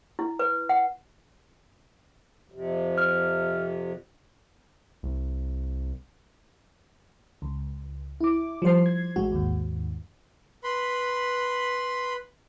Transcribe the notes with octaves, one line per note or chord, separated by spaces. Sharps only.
E4
B4
F#5
F2 C3
F6
C2
C#2
E4 D6
F3 G3 C5 C7
G#6
A1 G#3 F#4
D#2 G#2
B4 B5 C6